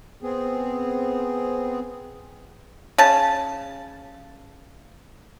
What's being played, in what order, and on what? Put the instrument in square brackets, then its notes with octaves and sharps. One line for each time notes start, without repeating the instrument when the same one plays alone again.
[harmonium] B3 C4 G#4
[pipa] C#3 A5